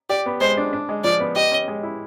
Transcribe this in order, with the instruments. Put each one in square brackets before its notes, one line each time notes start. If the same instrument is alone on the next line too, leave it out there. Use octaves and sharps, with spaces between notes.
[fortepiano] G4 [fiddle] D5
[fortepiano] B3
[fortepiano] G#3 [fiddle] C5
[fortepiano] D4
D4
G#3
[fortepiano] F3 [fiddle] D5
[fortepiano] B3
[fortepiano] G4 [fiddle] D#5
[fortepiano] C#4
G#3
E4